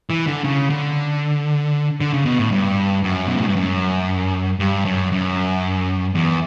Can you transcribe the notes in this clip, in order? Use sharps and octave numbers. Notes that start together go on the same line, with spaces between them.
E3
D3
C#3
D3
D3
C#3
B2
A2
G2
F#2
B2
A2
G2
F#2
G2
F#2
F#2
E2